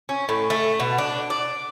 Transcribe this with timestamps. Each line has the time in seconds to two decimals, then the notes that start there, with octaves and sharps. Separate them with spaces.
0.09 C#4
0.29 A2
0.50 A3
0.80 B2
0.98 D4
1.30 D5